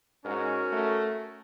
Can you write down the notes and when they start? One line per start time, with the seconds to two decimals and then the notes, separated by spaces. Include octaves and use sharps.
0.25 G#2 C#4 F#4 A#4
0.72 A3